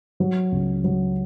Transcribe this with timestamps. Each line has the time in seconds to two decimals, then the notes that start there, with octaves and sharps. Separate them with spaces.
0.20 F#3
0.52 C#2
0.84 F#3